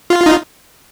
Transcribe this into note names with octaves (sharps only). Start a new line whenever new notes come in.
F4
D#4